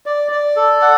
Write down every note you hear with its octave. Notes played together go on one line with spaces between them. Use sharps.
D5
D5
A4
F#5